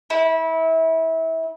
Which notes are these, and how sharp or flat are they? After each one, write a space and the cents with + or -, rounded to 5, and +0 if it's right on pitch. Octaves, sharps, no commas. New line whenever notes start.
E4 -25